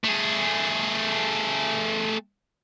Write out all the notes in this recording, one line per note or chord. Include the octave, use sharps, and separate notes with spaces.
A3 G#4